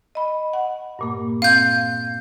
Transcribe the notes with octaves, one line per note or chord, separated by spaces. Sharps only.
D#5 B5
F#5
G2 A#2 A#3
C4 F5 G6